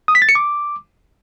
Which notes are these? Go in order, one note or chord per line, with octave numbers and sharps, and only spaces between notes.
D#6
B6
A6
C#7
D6